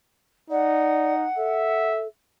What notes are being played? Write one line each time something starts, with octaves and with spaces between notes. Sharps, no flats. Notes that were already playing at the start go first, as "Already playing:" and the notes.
D#4 D5 F#5
A4 E5